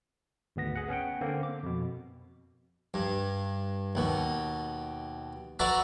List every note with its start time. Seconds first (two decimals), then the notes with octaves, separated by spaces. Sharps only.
0.56 G#1 D2 B3 A#6
0.76 G#4 F#5
0.88 B3 C#4 F#5 G5
1.21 D3 A#3 C4
1.43 D6
1.63 F2 B2
2.94 G2
3.95 D#2 B2
5.59 F#4 B4 D5 E5 A#5 B5